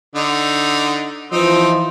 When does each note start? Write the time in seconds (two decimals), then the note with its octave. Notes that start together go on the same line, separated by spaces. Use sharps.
0.16 D3 D#4
1.32 E3 F3 C4 D#4